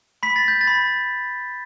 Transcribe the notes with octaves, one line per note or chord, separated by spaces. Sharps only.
B5 B6
A6
G6
A6
B5